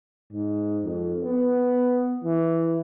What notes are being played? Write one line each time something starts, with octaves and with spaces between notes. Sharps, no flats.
G#2
F2
B3
E3